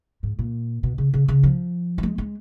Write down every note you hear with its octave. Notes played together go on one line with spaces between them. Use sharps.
G#2
A#2
B2
C#3
C#3
C#3
F3
F#3
G#3
G#3